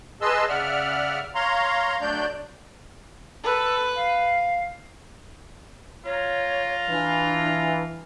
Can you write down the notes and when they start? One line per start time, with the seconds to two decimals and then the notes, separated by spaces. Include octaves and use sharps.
0.21 G#4 B4 D#5 A5 C6 E6
0.48 C#3 D5 E5 F#5 F6
1.35 C#5 F5 A#5 C6
2.01 F#3 A3 D4 D5 G6
3.44 A4 B4
3.95 F5
6.05 F4 C#5 A#5
6.88 E3 D4